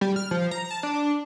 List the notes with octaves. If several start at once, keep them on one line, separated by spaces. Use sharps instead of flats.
G3
F6
F3
A#5
A5
D4